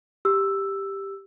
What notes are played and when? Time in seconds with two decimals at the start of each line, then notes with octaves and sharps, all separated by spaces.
0.25 G4 E6